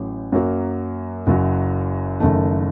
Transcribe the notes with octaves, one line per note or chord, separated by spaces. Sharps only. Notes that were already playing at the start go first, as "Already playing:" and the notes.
Already playing: A1 A2 F#3
F#2 F#3 A#3
F#1 F#2 F#3
F#1 F#2 D#3 A3